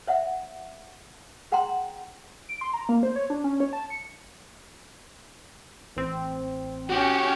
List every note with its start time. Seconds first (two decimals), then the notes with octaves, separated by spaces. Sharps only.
0.07 C#5 E5 F#5
1.52 G#4 F#5 G5 A#5 C6
2.49 D7
2.61 C6
2.74 A#5
2.89 A#3
3.03 C5
3.16 C#5
3.30 D4
3.44 C#4
3.60 C#5
3.73 A5
3.90 C#7
5.96 A1 C4
6.90 C#4 F#4 G4 G5